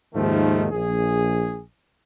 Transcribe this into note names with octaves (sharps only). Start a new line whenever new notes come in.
D#2 G#2 D#3 F3 A3
A#1 G#4